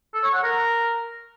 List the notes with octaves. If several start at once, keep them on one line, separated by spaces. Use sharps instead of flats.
A4
C#5
F#5
A#4